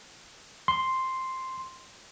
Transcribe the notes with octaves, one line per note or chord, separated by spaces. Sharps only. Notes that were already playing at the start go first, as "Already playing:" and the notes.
C6